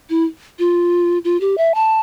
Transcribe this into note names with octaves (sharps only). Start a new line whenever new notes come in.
E4
F4
F4
G4
E5
A5